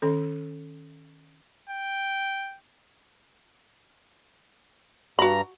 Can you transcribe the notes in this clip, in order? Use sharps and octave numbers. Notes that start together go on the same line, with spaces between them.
D#3 C#4 A4
G5
G2 F#4 A#5 B5